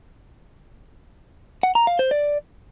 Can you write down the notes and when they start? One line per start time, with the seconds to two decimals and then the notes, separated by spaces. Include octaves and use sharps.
1.63 F#5
1.75 A#5
1.87 F5
1.99 C5
2.11 D5